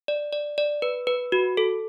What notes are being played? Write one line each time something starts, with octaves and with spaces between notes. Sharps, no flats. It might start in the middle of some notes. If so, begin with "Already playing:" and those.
D5
D5
D5
B4
B4
F#4
A4